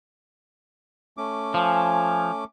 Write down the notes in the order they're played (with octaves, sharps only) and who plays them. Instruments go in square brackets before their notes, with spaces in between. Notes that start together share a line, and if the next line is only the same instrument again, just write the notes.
[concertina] A3 C#4 D6
[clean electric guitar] F3 [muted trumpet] G#5